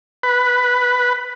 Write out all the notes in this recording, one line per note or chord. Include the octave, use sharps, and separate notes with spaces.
B4